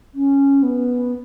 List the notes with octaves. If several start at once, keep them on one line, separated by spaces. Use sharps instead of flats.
C#4
B3